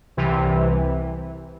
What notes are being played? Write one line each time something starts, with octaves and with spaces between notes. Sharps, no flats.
C2 C3 E3